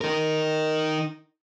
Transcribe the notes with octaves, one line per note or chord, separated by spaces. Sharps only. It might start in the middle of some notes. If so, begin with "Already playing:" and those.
D#4 A#4